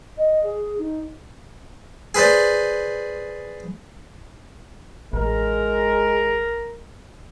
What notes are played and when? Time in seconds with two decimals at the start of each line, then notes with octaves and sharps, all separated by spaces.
0.17 D#5
0.43 G#4
0.78 D#4
2.15 G#4 B4 C5 D5
5.13 A1 G#3 A#4